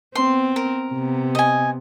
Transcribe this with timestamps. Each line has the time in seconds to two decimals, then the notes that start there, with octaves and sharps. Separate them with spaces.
0.15 B3 C4 C6
0.56 A#4
0.94 C3 B3
1.35 D#5 G#5